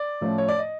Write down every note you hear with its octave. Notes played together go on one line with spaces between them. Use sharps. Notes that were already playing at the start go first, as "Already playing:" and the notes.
Already playing: D5
A2 F3 A3 C#4
C#5
D5
D#5